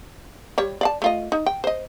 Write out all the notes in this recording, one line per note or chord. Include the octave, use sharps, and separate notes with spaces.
G3 C#5
D5 F5 A5
A3 F4 D#5
D#4
G5
C5 D#5